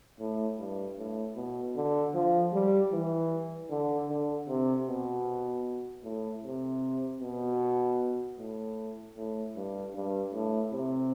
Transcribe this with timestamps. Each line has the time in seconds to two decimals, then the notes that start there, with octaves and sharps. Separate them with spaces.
0.20 A2
0.59 G2
0.98 A2
1.36 B2
1.76 D3
2.14 F3
2.53 G3
2.92 E3
3.70 D3
4.09 D3
4.49 C3
4.87 B2
6.04 A2
6.44 C3
7.21 B2
8.38 A2
9.17 A2
9.56 G2
9.94 G2
10.34 A2
10.72 C3